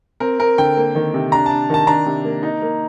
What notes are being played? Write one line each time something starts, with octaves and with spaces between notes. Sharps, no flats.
C4 A#4
C4 A#4
D3 G5
A#3
D#3
C3
D4 A#5
D4 A5
D#3 A5
D4 A#5
C3
A#3
D#4
A#3